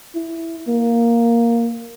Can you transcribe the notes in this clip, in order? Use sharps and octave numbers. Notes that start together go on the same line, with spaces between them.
E4
A#3